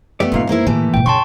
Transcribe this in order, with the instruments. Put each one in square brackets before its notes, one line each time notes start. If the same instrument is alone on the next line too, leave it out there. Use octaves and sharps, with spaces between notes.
[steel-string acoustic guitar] A3 B3 [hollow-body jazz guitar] G4 D5
[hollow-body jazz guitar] C#2 A#2 F5 [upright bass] G2 D#4
[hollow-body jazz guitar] A#3 [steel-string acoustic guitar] E4 A#4 C5
[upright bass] A2 D#3 [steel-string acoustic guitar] E3 A3 G4
[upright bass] G#2 B2 [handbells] G5
[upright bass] F#2 [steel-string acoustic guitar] C#3 [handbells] A5 C6 C#6